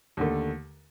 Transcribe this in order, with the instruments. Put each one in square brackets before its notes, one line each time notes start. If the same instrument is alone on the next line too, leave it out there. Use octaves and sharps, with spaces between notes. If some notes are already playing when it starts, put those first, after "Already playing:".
[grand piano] D#2 D3 A3